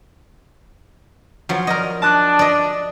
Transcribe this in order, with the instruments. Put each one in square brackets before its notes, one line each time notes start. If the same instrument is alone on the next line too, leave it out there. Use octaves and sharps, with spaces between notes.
[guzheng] F3 F#3
A#4 D5 D#5
[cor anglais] D4 [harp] A5 D#6 F#6
[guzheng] D5 D#5